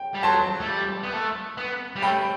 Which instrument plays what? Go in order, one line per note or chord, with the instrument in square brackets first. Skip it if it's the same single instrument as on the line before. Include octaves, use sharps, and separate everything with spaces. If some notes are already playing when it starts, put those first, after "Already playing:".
Already playing: [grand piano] G5
[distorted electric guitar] G3
[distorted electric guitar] F#3 [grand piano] A5 C6
[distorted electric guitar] A3
G3
B3
A3
B3
G3
[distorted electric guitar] A3 [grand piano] G5 B5